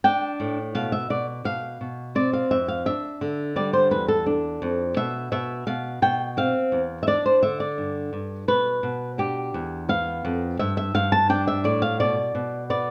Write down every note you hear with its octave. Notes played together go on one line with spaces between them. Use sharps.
D4 G5
A2
B2 F5
E5
B2 D5
B2 F5
B2
C4 D5
F5
F2 E5
F5
D4 E5
D3
G3 D5
C5
E2 B4
A4
D4
F2
B2 E5
B2 E5
B2 F5
B2 G5
C4 F5
E2
E5
D4 D5
C5
D3 E5
D5
G2
G2
B2 B4
B2
D4 G4
E2
B3 F5
F2
G2 E5
E5
G2 F5
A5
D4 G5
E5
A2 D5
F5
B2 D5
B2
B3 D5